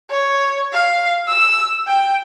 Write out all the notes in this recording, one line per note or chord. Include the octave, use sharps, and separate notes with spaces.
C#5
F5
E6
G5